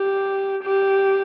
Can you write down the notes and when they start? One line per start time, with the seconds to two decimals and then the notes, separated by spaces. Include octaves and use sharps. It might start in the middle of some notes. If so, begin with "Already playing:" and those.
Already playing: G4
0.64 G4